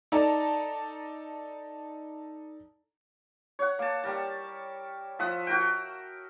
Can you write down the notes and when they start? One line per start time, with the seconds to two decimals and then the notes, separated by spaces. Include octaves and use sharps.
0.12 D#4 A4 D5 A5 A#5
3.59 C#5 F#5
3.79 A#3 A5
4.03 G3 A#4 A5
5.19 F3 E5 F#5 D#6
5.47 F#4 A#4 G5